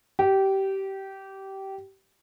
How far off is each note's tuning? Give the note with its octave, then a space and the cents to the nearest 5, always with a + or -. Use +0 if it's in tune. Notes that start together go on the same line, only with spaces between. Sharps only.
G4 -20